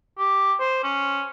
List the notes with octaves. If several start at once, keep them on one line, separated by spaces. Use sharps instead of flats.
G4
C5
C#4